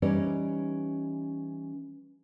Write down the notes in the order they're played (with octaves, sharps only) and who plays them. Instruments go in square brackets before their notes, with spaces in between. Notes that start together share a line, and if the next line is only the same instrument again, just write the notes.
[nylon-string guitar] E3 G3 C#4 D#4 C#5 D5